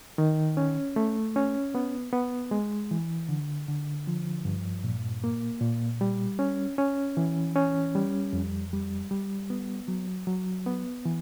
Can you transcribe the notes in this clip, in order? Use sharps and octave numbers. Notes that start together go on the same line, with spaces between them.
D#3
C#4
A3
C#4
B3
B3
G#3
E3
D3
D3
F3
G2
A#2
A#3
A#2
G3
C#4
C#4
E3
C#4
G3
F2
G3
G3
B3
F#3
F#3
B3
E3